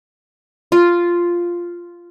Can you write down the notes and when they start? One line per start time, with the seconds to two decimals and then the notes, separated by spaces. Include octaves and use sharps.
0.72 F4